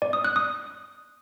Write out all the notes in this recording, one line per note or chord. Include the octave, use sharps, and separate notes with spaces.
D5
D#6
F#6
D#6